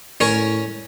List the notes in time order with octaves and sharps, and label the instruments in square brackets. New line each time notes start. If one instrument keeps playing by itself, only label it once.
[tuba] A2 [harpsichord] C#4 A#4 C#5